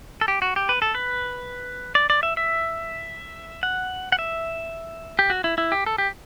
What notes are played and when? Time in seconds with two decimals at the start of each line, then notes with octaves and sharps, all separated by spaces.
0.21 A4
0.28 G4
0.42 F#4
0.56 G4
0.69 B4
0.82 A4
0.95 B4
1.95 D5
2.10 D5
2.23 E5
2.37 E5
3.63 F#5
4.12 F#5
4.19 E5
5.19 G4
5.30 F#4
5.44 E4
5.58 E4
5.72 G4
5.86 A4
5.98 G4